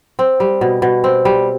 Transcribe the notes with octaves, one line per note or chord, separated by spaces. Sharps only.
C4
G3
B2
B2
C4
G3